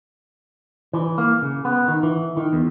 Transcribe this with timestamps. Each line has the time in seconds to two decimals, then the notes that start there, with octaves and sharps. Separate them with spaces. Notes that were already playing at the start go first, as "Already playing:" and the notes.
0.93 E3
1.18 A#3
1.42 C#3
1.65 B3
1.88 D#3
2.03 E3
2.37 D#3
2.53 E2